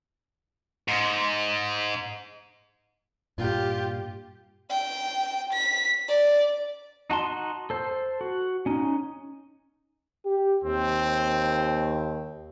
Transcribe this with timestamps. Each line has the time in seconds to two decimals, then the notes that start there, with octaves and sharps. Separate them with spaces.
0.88 G#2
3.38 G2 A#2 F4 G4
4.70 G5
5.53 B6
6.09 D5
7.10 D#4 F#4 A5 C6
7.70 A4 C5
8.21 F#4
8.66 C#4 D#4
10.25 G4
10.64 D#2 C4